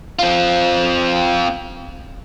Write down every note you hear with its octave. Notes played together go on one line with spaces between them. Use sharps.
C4 F4